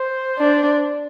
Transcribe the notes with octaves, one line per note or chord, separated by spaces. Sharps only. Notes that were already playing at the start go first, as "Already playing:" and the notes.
Already playing: C5
D4